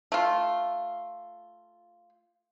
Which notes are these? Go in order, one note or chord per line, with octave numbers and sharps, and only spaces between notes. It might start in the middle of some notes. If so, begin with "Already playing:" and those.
A3 F4